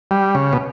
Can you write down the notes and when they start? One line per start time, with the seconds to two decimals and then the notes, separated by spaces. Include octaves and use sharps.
0.11 G3
0.35 C#3
0.53 B2